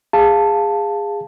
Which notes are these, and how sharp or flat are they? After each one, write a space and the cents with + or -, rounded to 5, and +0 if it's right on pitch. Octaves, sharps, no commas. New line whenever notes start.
G#4 -20 F5 +0 A5 +5